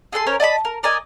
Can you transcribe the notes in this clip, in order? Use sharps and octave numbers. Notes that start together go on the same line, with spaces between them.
G#4 A4 F#5 C6
C#4 A#4 C5 C#5
D5 D#5 A5 B5
A#4
A#4 D5 D#5 G#5